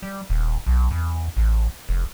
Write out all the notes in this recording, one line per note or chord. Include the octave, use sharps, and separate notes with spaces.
G3
D#1
B1
E2
A1
F1